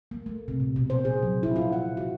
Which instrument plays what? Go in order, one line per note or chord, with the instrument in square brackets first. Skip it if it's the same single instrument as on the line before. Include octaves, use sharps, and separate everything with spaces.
[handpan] A#3
A3
C3
A#2
B2
C5
G#4
F#3
E4
F4
F#5
F#4